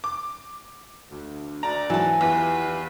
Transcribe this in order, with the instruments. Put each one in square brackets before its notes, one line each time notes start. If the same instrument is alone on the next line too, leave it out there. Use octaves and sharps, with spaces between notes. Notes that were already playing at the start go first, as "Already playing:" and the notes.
[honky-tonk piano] D6
[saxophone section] D2
[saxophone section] D2 D5 [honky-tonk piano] A#5
[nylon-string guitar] E3 A5 [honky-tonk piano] F#3
[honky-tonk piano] E2 [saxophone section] F4 G4 B4